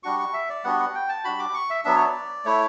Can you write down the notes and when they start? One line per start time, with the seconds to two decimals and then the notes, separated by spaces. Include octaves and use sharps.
0.03 G3 D4 F#4 C#6
0.19 C#6
0.33 E5
0.49 D5
0.64 G3 B3 D4 F#4 F#5
0.80 F#5
0.95 G5
1.09 A5
1.24 G3 D4 F#4 B5
1.39 D6
1.54 C#6
1.70 E5
1.85 F#3 B3 D4 E5
1.95 C#5
2.04 D5
2.45 A3 E4 C#5